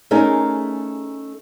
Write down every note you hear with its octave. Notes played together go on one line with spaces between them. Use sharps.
A3 C#4 D#4 G#4 A#4